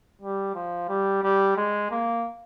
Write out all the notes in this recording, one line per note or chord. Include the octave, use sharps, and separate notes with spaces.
G3
F3
G3
G3
G#3
A#3